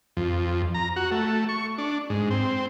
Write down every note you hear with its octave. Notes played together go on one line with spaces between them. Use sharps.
F2
A#5
F#4
A3
C#6
D4
G#2
C4